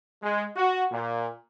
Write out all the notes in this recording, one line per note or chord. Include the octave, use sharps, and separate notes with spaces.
G#3
F#4
A#2